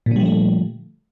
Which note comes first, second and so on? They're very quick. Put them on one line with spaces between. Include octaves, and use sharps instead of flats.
A#2 D3 G3 F3 A3